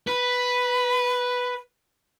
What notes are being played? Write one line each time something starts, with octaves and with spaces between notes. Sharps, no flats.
B4 B5